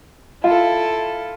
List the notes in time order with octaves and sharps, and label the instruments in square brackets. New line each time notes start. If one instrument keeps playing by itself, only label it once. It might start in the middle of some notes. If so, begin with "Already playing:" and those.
[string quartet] E4 A4 [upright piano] F4